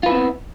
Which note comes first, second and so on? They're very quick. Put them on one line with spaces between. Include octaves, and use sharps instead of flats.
F4 B4 E4 C4 B3